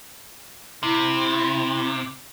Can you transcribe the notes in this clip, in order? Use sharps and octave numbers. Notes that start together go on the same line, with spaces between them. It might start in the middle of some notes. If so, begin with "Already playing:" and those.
C3 E4